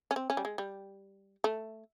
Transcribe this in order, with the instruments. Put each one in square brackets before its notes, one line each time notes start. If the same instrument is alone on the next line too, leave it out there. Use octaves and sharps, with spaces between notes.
[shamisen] C#4
C4
C#4
G3
G#3
G3
A3